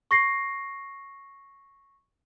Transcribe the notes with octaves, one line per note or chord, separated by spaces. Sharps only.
C#6 A#6 C7